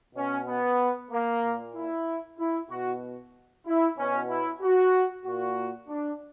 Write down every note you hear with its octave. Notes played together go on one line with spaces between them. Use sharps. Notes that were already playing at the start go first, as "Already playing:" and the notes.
B2 C#4
B3
A#3
A#2
E4
E4
B2 F#4
E4
B2 C#4
E4
F#4
A#2 F#4
D4